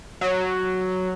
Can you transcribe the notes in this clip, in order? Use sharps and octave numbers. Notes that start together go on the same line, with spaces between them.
F#3